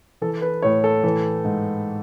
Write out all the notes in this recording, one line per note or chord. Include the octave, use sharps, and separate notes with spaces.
E3 A4
B4
A2 C#5
A4
E3
G#2